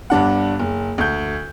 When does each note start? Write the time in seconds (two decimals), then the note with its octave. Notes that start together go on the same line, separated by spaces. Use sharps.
0.10 G1 G2 D4 F#5
0.59 F#1
0.98 D2 G6